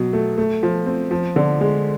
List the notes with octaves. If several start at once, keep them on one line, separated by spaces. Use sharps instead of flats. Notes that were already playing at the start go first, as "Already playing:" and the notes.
Already playing: B2 F#3
A3
A3
F3
C4
F3
D3
G#3